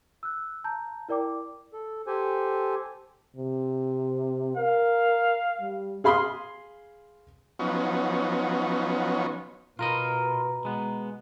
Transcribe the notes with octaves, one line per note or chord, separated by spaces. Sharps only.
E6 F#6
A5 A#5 G6
E4 A#4 D5 G5 D6
A4
G4 A4 C5 G#5
C3
A#4 F5
G3
G#4 F5 B5 C6 D#6
F3 F#3 B3 C#4 D#4
B2 F4 A#4 D#5 A#5 B5
G#3 B3